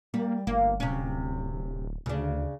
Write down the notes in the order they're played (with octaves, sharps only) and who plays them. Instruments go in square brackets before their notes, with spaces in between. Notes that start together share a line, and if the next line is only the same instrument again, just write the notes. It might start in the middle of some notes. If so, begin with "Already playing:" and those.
[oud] G3 [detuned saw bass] A#3
[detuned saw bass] G1 [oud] A#3
[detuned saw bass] D1 [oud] C3 C#4
[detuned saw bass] D2 [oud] C#3 D4